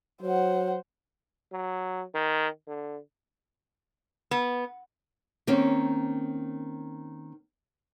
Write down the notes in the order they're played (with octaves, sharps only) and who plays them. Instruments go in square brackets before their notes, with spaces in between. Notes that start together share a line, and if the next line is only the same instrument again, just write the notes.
[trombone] F#3 [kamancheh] C5 F#5
[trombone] F#3
D#3
D3
[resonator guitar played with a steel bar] B3
[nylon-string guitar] D#3 A#3 C4 C#4